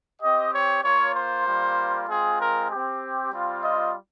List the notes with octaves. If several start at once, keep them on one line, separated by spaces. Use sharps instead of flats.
C4 G4 D#5
C#5
A#3 F4 C#5
C5
G3 A#3 F4
G#3 C4 F4 G#4
A#4
C4 G4
G3 C4 F4
D#5